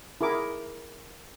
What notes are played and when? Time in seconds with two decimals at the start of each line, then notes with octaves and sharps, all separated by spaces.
0.21 E4 G#4 A#4 D6